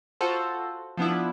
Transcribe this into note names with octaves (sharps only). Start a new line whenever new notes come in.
F4 F#4 A4 C5
F3 B3 D4 E4